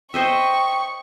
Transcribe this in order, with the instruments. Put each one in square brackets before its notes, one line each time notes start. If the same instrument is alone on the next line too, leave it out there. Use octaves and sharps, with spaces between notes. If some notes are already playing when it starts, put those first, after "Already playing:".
[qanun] C5 D#5 E5 [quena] G5 [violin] C#6